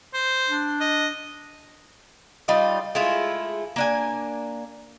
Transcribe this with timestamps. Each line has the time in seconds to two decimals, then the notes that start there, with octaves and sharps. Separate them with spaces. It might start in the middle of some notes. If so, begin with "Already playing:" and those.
0.14 C5
0.48 D4
0.81 D#5
2.48 G3 D#4 F4 D#5
2.95 G#3 A3 E4 F4
3.76 A#3 D4 G#5